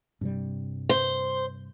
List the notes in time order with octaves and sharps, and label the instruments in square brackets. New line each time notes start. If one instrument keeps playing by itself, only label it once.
[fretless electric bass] G2 C3 G3
[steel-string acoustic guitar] C5